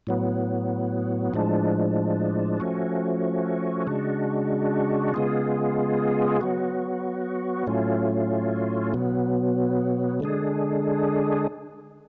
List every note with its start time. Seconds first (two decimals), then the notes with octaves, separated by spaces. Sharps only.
0.07 A2 F#3 B3
1.34 A2 F3 G#3 D4
2.60 F3 A3 C#4 F#4
3.87 C#3 G#3 D4 F#4
5.14 C#3 G#3 B3 F4 G#4
6.41 F#3 B3 F#4
7.67 A2 F#3 A3 C#4 F4
8.94 B2 F#3 B3
10.20 D3 G#3 D4 G#4